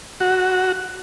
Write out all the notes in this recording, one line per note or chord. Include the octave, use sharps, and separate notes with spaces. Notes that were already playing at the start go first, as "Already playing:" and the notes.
F#4